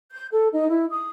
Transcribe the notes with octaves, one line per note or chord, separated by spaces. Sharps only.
G6
A4
D#4
E4
D#6